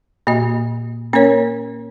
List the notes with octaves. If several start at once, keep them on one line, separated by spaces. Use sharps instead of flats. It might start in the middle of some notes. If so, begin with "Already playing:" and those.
A#2 A#3 F#4 D#5
A#3 C#4 A#4 C#5